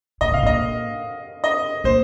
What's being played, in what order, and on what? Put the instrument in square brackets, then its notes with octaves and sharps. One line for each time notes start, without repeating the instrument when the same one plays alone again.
[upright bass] A#2 [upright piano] D#5
[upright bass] C3 [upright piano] F5
[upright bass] A#2 [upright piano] D#5
[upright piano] D#5
[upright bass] A#2 [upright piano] C5